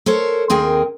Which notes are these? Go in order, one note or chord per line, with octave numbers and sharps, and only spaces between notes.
A4 A#4 C5 C#5
D#2 C4 G#4 A#4 G5